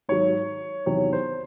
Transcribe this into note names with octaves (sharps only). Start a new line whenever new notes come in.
G#2 D#3 F#3 C#5
E2 C3 D#3 F#3 C#5
C5